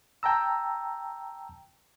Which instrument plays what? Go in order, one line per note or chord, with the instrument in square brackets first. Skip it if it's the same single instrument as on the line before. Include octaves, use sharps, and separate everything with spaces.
[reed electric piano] G5 A5 A#5 E6